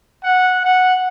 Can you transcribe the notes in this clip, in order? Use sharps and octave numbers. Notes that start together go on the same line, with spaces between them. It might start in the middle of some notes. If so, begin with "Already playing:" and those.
F#5
F#5